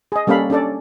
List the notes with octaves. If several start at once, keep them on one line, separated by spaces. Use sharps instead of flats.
G#4 D#5
G3 A#3 C#4 A4 F5 B5
C#4 D4 A4 D5